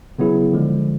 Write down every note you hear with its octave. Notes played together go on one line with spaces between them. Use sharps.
C#3 F#3 B3 E4 G#4
D3 F3 G#3